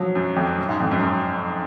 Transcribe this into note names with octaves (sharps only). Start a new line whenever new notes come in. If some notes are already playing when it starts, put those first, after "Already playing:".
Already playing: F3 F#3
F#2
F2
F#2
G#2
F2
F#2
F#2